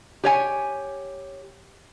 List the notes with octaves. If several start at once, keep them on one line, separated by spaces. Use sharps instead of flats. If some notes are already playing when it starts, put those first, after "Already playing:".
G4 C#5 G#5